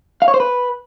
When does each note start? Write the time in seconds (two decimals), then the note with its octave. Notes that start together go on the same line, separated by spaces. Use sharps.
0.22 F5
0.28 C#5
0.34 C5
0.40 B4